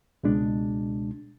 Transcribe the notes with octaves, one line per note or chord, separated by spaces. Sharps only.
C#2 B2 G#3 D4